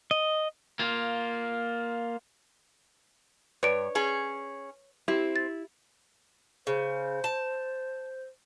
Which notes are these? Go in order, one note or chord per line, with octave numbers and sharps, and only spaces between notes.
D#5
A#3 F4
G2 B4 C#5 D5 D7
C#4 G#4
C4 E4 G4
A6
C#3 C5
A5